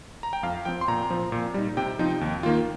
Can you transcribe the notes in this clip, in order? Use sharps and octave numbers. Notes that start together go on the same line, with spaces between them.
A#5
G5
F2 F5
F3 C4 G5
C6
A#2 A#5
F3 C4
A#2
G3 D#4
C3 G5
F3 C4 D#4
D#2
D#3 A#3 F4